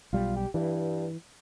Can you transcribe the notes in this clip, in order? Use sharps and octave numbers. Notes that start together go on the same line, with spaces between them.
B1 G3 F4
G4
G2 E3